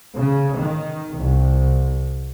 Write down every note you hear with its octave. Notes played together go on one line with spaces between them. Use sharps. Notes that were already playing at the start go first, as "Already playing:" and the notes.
C#3
D#3
C2